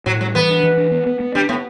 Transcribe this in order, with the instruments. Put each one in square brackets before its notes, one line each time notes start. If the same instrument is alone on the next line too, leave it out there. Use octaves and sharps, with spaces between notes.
[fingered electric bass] A2 [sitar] F#3
[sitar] F#3 [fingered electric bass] G3
[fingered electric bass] E3 [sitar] B3
[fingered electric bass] D4
E3
D4
B3
B3
B3
[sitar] G3 [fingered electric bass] D4
[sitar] A2 [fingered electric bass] B3